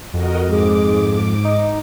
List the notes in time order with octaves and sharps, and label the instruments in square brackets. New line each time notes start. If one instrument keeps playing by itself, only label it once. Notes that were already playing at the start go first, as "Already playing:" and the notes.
[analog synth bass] F2 [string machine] F#4 A#4 D#5
[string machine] G#2 D6 [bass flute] G#3
[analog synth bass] D#4 [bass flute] D#5